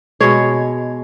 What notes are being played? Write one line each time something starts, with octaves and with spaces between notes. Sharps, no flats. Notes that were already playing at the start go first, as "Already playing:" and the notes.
B2 G#3 C#5